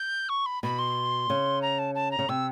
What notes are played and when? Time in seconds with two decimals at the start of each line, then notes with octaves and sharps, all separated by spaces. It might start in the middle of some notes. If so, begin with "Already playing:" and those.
Already playing: G6
0.29 C#6
0.46 B5
0.63 B2 B5
0.79 C6
1.30 C#3
1.62 A#5
1.79 A5
1.95 A5
2.11 A#5
2.19 C#3
2.29 C3 E6